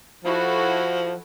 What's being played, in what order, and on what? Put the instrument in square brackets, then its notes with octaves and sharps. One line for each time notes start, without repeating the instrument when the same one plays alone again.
[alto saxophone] F3 [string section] E4 F#4 A4